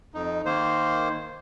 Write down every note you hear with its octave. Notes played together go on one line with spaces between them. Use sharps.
F2 D#4
D#3 A#3 C5